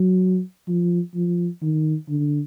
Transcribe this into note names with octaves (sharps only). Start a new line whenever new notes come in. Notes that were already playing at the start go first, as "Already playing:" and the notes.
Already playing: F#3
F3
F3
D#3
D3